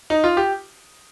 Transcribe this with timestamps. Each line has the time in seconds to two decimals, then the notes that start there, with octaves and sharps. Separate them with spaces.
0.10 D#4
0.24 F4
0.37 G4